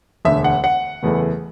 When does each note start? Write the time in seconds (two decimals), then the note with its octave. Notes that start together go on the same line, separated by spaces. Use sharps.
0.25 E1 D2 D3 E5
0.44 F#5
0.64 F#5
1.03 F#1 E2 E3 A3